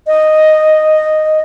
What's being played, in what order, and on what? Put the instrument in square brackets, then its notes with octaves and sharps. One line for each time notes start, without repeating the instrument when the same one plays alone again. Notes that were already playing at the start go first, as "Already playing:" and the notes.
[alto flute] D#5